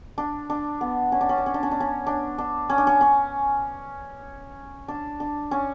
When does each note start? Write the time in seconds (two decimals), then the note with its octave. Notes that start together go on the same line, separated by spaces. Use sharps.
0.18 D4
0.50 D4
0.81 B3
1.12 C#4
1.21 D4
1.29 C#4
1.38 D4
1.46 C#4
1.54 D4
1.63 C#4
1.71 D4
1.80 C#4
2.07 D4
2.38 D4
2.70 C#4
2.78 D4
2.87 C#4
3.01 C#4
4.88 D4
5.20 D4
5.51 C#4